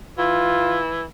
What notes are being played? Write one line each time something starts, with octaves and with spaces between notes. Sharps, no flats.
E3 F4